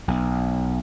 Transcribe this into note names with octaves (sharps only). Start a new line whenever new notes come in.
B1